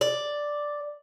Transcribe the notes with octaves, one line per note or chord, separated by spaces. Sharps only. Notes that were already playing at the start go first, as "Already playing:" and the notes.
D5